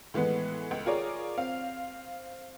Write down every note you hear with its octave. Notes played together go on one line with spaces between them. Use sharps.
A2 E3 G#3 B3
C#2
F4 G#4 A#4 C#5 D5
C4 F5